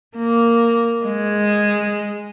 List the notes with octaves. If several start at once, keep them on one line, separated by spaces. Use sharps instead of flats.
A#3
G#3